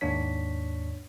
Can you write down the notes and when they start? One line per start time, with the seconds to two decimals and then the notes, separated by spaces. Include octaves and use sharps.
0.01 D#2 G#2 D4 C#5 B6